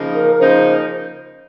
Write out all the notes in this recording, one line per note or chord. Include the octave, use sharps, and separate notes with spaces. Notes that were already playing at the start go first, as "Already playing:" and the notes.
Already playing: C#3 F3 A#3 D#4
A#4
C#3 F3 A#3 D#4 C5